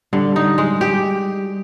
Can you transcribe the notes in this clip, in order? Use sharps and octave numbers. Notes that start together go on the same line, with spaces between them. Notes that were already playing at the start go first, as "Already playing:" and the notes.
D3 G3
D#4
G#3
G4